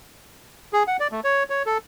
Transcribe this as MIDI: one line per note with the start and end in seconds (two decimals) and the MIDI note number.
0.73 0.83 68
0.88 0.97 78
1.00 1.08 74
1.12 1.20 57
1.24 1.43 73
1.50 1.63 73
1.66 1.78 69